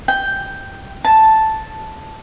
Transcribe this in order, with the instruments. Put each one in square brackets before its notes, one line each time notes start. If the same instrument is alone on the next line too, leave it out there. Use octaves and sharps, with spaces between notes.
[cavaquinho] G5
A5